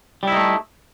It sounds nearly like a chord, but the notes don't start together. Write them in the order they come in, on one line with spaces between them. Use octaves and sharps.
G3 E4 D#4 A3